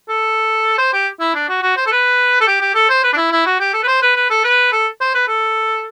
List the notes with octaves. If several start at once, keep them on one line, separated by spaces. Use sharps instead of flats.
A4
C5
G4
E4
D4
F#4
F#4
C5
A4
B4
A4
G4
G4
A4
C5
B4
D4
E4
E4
F#4
G4
A4
B4
C5
B4
B4
A4
B4
A4
C5
B4
A4